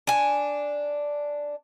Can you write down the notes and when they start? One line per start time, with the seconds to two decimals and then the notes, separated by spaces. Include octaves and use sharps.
0.07 D4 G#5